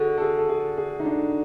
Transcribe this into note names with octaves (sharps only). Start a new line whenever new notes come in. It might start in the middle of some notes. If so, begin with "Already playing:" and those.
Already playing: D3 F#4 G#4
A4
G#4
A4
G#4
G#4
D#4
D4